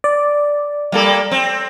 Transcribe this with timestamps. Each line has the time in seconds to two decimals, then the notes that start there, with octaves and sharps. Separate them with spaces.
0.04 D5
0.92 G3 A#3 A4
1.31 C4